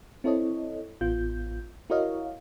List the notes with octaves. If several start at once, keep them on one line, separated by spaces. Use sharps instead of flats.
C4 E4 A4 C#5 D#5
A1 B3 F4 G6
E4 F#4 A#4 C#5 D#5 F5